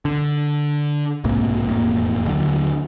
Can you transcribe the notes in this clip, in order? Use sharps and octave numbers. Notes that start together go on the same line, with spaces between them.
D3
B1 G#2 C3 A#3
E1 F2 A2 A#3
D#2 D3 F#3